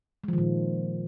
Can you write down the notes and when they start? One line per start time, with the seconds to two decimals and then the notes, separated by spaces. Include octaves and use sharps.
0.24 G#3
0.28 F3
0.33 D#3
0.38 A#2